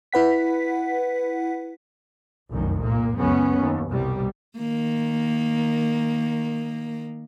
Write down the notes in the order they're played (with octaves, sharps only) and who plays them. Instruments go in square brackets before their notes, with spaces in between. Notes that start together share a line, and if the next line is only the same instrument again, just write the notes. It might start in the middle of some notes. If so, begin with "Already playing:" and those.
[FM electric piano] E4 B4 F#5 B6
[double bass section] F1 C2 F#2 D#3
A#2 A#3
C#2 F#2 B3 C#4
D#2
C2 B2 G3
[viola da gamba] D#3 A#3